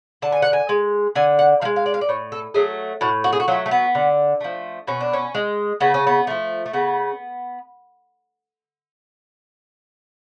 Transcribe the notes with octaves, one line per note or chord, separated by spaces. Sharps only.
D3 A5
G#5
F#5
G#5
G#3
D3 G#5
F#5
F3 F5
G#3
F5
D5
F5
D5
A2 C#5
A4
F#3 A3 G#4
A2 F#4
F#4
G#4
F#4
F#3 A3 F4
A3
B3
D3
F3 A3
B2 C#4
D4
C#4
G#3
C#3 B3
C#4
B3
F3 A3
A3
C#3 B3